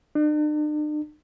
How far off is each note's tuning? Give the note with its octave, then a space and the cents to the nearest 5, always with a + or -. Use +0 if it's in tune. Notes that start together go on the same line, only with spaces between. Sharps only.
D4 +45